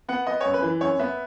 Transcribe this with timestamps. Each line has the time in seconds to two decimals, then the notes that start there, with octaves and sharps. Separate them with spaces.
0.08 B3 F#5
0.27 B3 D#5
0.41 F#2 C#5
0.54 B4
0.62 E3
0.81 F#2 C#5
0.99 B3 E5